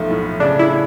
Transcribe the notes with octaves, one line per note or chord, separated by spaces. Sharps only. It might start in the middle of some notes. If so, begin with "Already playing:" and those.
Already playing: B1 F3 A3
A2
C#3 D4
E4